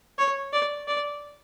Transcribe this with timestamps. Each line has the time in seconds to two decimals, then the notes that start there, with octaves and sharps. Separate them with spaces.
0.18 C#5
0.53 D5
0.88 D5